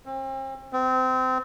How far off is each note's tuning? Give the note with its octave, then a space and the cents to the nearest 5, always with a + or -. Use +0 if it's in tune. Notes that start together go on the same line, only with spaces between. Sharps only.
C4 +40
C4 -25